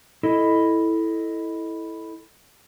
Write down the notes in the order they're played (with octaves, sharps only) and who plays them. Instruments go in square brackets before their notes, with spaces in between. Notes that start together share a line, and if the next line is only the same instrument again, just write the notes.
[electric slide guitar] E4 A4 D#5